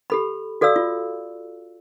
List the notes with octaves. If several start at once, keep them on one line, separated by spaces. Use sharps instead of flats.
G4 A4 B5
F#4 A4 D5 F5 E6
F4